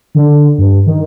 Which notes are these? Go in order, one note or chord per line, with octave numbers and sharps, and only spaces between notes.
D3
G2
D#3